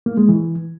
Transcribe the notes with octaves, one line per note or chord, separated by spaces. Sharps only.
A#3
G#3
E3